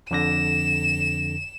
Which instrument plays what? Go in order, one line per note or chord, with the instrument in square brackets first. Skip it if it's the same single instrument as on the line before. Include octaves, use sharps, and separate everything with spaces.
[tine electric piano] F2 D3 A#6 [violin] E7